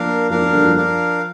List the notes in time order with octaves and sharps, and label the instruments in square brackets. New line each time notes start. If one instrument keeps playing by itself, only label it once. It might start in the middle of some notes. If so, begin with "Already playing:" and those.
Already playing: [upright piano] F3 A#3 [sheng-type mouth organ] D4 A#4 F5
[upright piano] F3 A#3 [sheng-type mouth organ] D4 A#4 F5
[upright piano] F3 A#3
D3 G3
F3
[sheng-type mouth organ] D4 A#4 F5